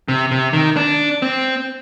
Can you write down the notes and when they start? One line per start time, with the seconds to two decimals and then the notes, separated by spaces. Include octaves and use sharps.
0.08 C3
0.31 C3
0.53 D#3
0.77 D4
1.22 C4